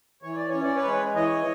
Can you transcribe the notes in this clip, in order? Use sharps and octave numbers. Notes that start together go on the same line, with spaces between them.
E3 C#5
D5
C#5
C#4
D5
B4 C#5
G#3
E3 C#5 D#5